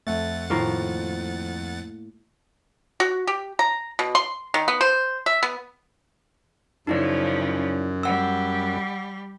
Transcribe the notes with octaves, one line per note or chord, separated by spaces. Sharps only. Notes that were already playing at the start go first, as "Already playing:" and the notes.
F2 A3 F#5 A6
A2 D#3 F3 A#3 F5
F#4
G4
A#5
B2
C6
D#3
B3
C5
E5
B3
F#2 C#3 F3 D#4 E4 D5
G3 F#5 E6